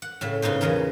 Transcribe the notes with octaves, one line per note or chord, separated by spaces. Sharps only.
F#5
A2 C#3 E5
G#2 C#3 B3 D#4 C5
E2 A#2 G#4 A#4 A#5